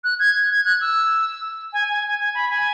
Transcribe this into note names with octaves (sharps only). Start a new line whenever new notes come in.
F#6
G#6
G#6
F#6
E6
G#5
G#5
G#5
G#5
B5
G#5